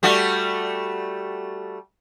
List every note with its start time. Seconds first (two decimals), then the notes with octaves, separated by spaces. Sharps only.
0.03 G3 A3 F#4